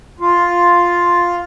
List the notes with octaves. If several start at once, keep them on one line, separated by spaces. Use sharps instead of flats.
F4